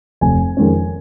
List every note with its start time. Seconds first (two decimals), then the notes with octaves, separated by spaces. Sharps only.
0.21 F1 G#5
0.57 F2 D#3 G#3 C#4